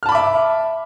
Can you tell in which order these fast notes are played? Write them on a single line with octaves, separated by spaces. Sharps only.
F6 A5 B5 D6 E5